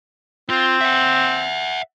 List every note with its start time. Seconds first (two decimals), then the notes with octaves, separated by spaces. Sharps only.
0.50 C4 F4
0.81 E5 F#5